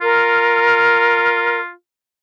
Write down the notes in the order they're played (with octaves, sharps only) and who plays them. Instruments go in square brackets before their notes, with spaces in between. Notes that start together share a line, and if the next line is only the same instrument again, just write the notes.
[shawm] F4 [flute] A#4